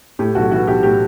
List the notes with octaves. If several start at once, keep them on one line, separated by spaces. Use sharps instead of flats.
A2 G4
B1 F#4
E3 F#4
B1 G4
A2 G4